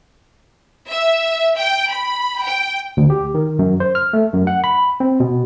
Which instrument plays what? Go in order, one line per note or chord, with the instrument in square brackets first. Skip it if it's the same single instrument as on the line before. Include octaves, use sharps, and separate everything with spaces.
[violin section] E5
G5
B5
G5
[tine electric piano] D2
G4
D#3
F#2
C5
F6
A3
F#2
F#5
B5
C4
B2